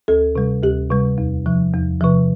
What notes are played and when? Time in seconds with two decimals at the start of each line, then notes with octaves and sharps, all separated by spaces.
0.08 D2 A4
0.36 C3 G3
0.63 D2 G4
0.91 C3 G3
1.18 E2
1.46 C3 F3
1.74 E2
2.01 C3 F3